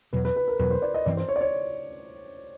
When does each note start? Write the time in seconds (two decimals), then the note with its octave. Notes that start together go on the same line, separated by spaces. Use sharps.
0.13 E2 B2 F#3 B4
0.25 B4
0.36 B4
0.48 A#4
0.59 E2 B2 F#3 B4
0.71 C5
0.82 D5
0.94 D#5
1.06 G2 E3 G3 C4 D5
1.17 C5
1.29 C#5
1.36 D5
1.41 C#5